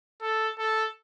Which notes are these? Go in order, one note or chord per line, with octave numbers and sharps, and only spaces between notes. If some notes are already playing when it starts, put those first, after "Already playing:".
A4
A4